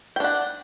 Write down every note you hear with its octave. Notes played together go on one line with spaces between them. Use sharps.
D4 F#5 G5